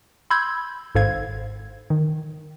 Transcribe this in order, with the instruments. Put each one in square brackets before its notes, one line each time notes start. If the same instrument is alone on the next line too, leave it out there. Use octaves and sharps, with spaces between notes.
[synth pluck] B5 C6 E6 G6 G#6
G#1 G#2 A4 C5 F5 G#6
D#3